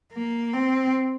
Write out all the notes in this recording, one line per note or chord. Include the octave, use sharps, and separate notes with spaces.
A#3
C4